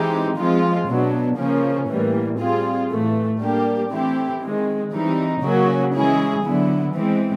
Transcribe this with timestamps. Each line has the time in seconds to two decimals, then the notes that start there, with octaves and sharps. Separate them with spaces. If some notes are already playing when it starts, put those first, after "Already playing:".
Already playing: E3 G#3 C4 D#4 G4
0.37 F3 G#3 C4 F4
0.88 B2 F#3 B3 D4
1.38 C#3 F3 A#3 C#4
1.88 A2 E3 G3 A#3
2.39 G3 C4 F4 G#4
2.90 A2 E3 A3
3.40 G3 A#3 D4 G4
3.91 E3 A3 C4 E4 G4
4.41 D#3 G#3 C4
4.92 E3 G3 C4 D#4
5.43 C#3 F#3 A#3 C#4 F#4
5.94 E3 G#3 C#4 E4 G#4
6.44 D3 F#3 B3 E4
6.94 E3 G#3 C4